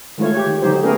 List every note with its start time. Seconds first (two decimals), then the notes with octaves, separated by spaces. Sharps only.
0.18 D#3 G#3 A3 F4 C#5
0.34 G4 C#5
0.46 D#3
0.62 D3 F#3 D#4 G4 C5
0.83 A3 B3 C#4 G#4 A#4